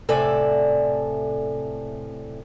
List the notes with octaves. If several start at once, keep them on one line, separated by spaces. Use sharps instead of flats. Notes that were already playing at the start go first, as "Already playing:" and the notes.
A2 C3 A4 D5 E5 G#5